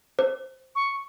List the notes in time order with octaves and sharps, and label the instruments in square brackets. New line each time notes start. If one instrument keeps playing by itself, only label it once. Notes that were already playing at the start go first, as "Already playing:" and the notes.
[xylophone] C5
[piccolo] C#6